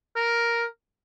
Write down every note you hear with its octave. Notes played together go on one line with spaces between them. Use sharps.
A#4